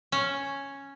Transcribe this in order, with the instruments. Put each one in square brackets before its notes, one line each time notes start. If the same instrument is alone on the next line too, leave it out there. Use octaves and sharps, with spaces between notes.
[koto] C#4